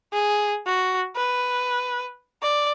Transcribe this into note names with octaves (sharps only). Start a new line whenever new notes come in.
G#4
F#4
B4
D5